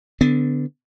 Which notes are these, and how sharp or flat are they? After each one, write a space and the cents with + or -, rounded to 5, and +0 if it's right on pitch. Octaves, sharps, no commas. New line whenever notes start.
D3 +0 B3 +30